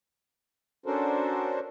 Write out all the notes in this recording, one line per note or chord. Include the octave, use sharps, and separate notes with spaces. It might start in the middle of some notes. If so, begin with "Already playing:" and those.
C#4 D4 F#4 A4 A#4 C5